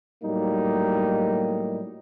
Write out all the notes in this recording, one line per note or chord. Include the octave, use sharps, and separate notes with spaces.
A2 F#3 G3 A#3 D#4